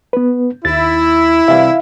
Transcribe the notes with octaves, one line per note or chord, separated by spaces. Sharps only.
B3 B4
D#2 E4 A6
C3 E3 G3 E5 F5